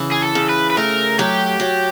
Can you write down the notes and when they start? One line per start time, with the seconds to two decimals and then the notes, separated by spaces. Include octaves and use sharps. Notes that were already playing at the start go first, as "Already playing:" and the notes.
Already playing: C#3 E3
0.11 G#4
0.22 A4
0.35 C#3
0.49 B4
0.70 B4
0.77 A3 A#4
1.19 F#3 G4
1.60 F#3